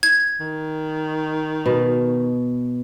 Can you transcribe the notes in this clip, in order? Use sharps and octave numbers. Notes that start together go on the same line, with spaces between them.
G#6
D#3
B2